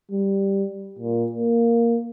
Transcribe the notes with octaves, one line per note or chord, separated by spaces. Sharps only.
G3
A#2
A#3